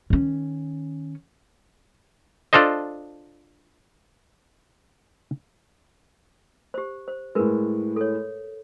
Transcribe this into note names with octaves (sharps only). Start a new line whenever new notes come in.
D#3 C#4
D4 F4 A4 C5 D#5
G4 C5
C5
A2 G#3 A#4 B4
A4 C#5